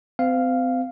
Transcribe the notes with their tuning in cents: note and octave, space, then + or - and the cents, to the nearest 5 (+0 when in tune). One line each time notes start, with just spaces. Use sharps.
C4 -35 F5 -5